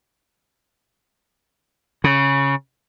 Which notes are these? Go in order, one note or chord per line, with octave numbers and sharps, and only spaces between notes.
C#3